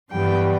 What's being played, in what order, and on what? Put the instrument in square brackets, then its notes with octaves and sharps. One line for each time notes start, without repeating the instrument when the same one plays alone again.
[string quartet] G2 E3 G3 B3 G5